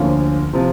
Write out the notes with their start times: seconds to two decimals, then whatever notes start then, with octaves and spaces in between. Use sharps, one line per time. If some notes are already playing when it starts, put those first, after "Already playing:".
Already playing: D2 D3 F3 A#3 C#4
0.53 C3 F3